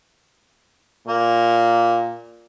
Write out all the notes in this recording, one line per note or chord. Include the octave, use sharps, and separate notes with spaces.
A#2 A#3